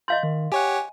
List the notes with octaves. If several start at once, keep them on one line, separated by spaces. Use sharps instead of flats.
D#5 F5 C6 G6
D#3
G4 C#5 F#5 G#5